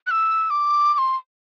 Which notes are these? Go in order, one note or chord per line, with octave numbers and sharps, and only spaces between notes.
F#6
E6
D6
D6
C6